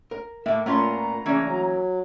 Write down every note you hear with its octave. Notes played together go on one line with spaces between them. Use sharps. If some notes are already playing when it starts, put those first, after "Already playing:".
A#4
A2 A3 A#3 E5
A#2 A3 B3 C#4 F4 A#5 C6
C#3 E3 A#3 C#4 D4
F#3